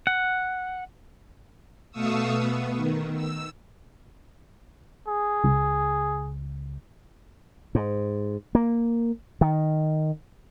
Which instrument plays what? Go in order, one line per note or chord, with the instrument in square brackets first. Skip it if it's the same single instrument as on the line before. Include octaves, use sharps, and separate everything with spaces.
[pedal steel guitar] F#5
[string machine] B2 A3 F5 C#6 D#6 E6
B3
D#3
E6
[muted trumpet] G#4
[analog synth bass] C#2
[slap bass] G#2
A#3
D#3